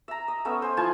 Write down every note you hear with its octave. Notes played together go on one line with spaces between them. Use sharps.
E5 A#5
D#5
A3 B3 C#4 E5
C5 D#5 G#5
F3 E4 G#5 A5